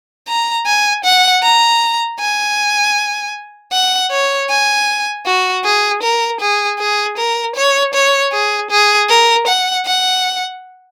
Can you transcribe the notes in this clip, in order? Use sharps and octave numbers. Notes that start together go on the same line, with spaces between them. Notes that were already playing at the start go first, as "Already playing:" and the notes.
A#5
G#5
F#5
A#5
G#5
F#5
C#5
G#5
F#4
G#4
A#4
G#4
G#4
A#4
C#5
C#5
G#4
G#4
A#4
F#5
F#5